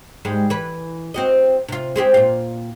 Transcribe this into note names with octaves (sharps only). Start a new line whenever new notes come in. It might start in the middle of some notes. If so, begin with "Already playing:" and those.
G#2 G3 G#3
E3 B4
C4 F#4 D#5
C3 F4
G#3 C4 G4
A#2 F4